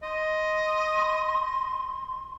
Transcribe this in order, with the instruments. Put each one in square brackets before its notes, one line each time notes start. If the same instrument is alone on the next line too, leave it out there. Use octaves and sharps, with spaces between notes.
[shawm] D#5 [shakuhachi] C6